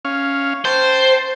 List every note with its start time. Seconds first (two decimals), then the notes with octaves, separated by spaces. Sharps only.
0.05 C#4 F5
0.65 C5 G5 A5